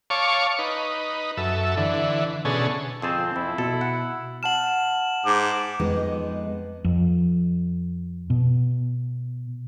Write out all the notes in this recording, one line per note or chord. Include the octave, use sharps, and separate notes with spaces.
C#5 F5 A5 C#6 D6
D#4 B4
F#2 A4 E5
D3 E3
B2 D3 C#4 G#4 A4
F2 C4 G#4 A5
F2 E4
B2 A4
F#5
F#5 A5 F6 E7 F#7
G#2 D6
F2 G#3 B3 D#4
F2
B2